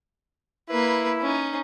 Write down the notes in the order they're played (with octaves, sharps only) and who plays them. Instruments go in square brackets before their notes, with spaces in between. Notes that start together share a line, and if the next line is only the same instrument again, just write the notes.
[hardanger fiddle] A#3 B4 [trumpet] E4
[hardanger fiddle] C#4 D#4